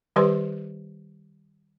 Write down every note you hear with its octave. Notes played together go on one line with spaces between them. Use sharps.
D#3 G3 G4 B4 D5 C6